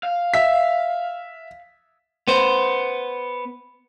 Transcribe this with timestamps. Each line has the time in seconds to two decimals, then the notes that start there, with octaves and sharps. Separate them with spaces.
0.03 F5
0.34 E5 B6
2.28 B3 C5